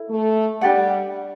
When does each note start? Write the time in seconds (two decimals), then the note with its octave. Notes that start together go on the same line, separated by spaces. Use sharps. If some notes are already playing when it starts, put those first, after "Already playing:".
Already playing: E4 A4
0.09 A3
0.61 G3 D4 G4 D5 F#5